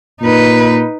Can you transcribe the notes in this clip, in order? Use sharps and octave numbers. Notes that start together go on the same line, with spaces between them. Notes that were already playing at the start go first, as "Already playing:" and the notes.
A#2 D#4 B4